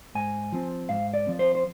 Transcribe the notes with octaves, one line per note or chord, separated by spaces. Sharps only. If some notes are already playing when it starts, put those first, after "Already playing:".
G#2 G#5
F3 C4
G#2 F5
D5
F3 C4
C5
C5